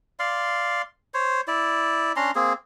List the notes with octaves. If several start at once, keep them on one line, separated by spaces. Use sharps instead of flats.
D5 F5 C6
C5 C#5
E4 D5
C#4 D4 A#5 C6
A#3 C4 G#4